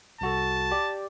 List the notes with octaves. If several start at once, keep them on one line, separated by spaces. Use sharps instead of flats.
C2 F#4 A4 A5
G4 D5